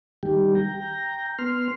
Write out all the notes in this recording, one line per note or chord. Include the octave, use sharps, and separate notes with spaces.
D#3 G3 G4
G5 A#5
B3 C6 F6